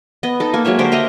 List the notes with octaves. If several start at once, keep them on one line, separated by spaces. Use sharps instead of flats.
B3 D#5
D#4 A4
A#3 G#5
F#3 G#3 C#5 E5
D3 G4 A#4 C5
D#5 E5 A#5 C6